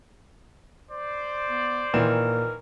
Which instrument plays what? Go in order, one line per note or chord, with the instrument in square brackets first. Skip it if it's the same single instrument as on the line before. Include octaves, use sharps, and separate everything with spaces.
[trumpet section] C5 D5
[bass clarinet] B3
[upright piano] A#2 E7 [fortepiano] D#3 E3 [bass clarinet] A#4